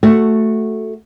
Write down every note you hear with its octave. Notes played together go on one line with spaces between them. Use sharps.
A3 F#4